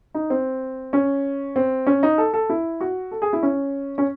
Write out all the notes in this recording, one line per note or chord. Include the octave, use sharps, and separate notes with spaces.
D#4
C4
C#4
C4
C#4
D#4
A4
A4
E4
F#4
A4
G#4
E4
C#4
C#4